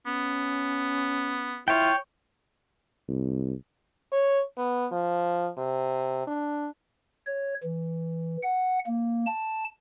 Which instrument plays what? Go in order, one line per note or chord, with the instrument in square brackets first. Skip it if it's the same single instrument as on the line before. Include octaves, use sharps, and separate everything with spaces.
[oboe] B3 [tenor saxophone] C#4
[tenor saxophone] E4 [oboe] F4 [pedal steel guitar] C#5 G5
[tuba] C2
[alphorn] C#5
B3
F3
C3
D4
[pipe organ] C#5
E3
F#5
A#3
A5